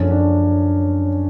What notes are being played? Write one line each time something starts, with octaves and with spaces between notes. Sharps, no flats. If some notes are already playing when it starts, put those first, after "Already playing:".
Already playing: F#1 F#2 D3 F3 C#4
D4